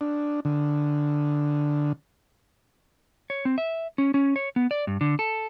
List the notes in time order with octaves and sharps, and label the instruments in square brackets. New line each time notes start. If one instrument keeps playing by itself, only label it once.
[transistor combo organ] D4
D3
[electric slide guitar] C#5
C4
E5
C#4
C#4
C#5
B3
D5
G2
D3
A4